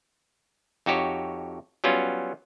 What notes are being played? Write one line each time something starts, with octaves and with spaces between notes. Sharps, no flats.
F2 D#4 F#4 G4 C#5
F#3 G3 B3 C#4 F4